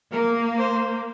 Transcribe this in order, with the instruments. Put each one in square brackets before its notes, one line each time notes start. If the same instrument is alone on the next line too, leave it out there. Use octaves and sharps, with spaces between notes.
[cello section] A#3 [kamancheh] A#4
[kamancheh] C5